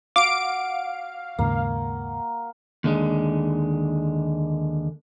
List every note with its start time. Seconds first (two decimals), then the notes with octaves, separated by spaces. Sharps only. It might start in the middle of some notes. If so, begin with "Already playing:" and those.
0.16 F#4 F5 D6 D7
1.39 D#2 G#2 C#3 A#3
2.84 D#2 D3 G#3